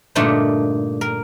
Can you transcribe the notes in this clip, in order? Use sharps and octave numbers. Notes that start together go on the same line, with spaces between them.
G2 A#2 D3 A3 D4 D#4
A#4